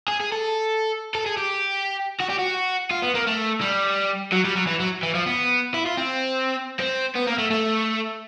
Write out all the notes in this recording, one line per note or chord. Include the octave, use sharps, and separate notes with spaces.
G#4
G#4
A4
A4
G#4
G4
F#4
G4
F#4
F4
B3
A#3
A3
G3
F#3
G3
F#3
E3
F#3
E3
F3
B3
E4
F4
C4
C4
B3
A#3
A3
A3